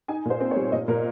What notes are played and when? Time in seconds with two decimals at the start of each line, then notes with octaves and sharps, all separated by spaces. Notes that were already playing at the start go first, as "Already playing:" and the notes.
0.08 D#4 G#5
0.25 A#2 C5
0.40 C4
0.51 C#5
0.56 G3
0.72 A#2 D#5
0.88 A#2 A#4